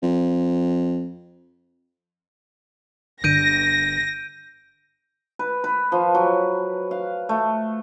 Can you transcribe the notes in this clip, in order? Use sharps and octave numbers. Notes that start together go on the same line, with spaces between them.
F2
G1 D3 G6 A#6 D7 D#7
B4
B4
F3
F#3
F5
A3